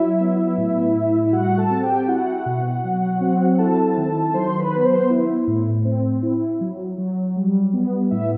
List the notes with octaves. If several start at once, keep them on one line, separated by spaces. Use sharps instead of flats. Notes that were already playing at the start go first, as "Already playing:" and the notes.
Already playing: F#3 E4 E5
B3
A2
A2
E5
G3 F#4 F#5
A4 A5
C4
G4 G5
E4 F#4 F#5
B2
F#3
C4
E4 A4 A5
D#3
F#3 C5 C6
B4 B5
B3
C5 C6
E4
A2
C4
E4
F#3
F#3
G3
B3
A2 E4 E5